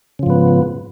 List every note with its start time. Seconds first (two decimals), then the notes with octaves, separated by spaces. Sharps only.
0.19 C#3
0.23 F3
0.26 G#2
0.30 B3